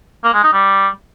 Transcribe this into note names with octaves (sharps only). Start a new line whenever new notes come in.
A#3
G#3
D#4
G3